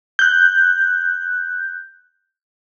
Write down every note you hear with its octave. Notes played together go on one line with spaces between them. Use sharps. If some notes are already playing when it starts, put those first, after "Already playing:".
F#6 G6